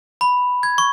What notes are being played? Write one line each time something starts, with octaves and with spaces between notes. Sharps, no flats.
B5
G#6
C#6